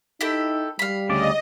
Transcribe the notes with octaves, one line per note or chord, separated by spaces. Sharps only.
D#4 E4 G4 A4
G3 F5 B5
D2 C#3 D5 D#5